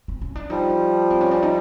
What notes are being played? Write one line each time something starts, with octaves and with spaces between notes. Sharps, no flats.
C4
C#4
D4
F3 G3 D#4
C4
C#4
D4
D#4